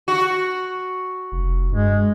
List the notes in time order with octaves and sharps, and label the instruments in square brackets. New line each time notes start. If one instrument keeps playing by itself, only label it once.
[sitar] F#4
[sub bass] F1
[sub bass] G2 [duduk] G#3